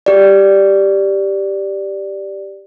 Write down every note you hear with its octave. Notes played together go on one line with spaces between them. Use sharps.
G4 D5